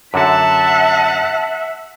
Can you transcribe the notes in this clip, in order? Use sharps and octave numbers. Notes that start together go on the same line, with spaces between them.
F#2 D3 F#4 E5 F#5 A5